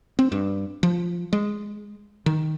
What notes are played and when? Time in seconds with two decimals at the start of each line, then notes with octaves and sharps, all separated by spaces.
0.19 C4
0.32 G2
0.83 F3
1.33 G#3
2.26 D#3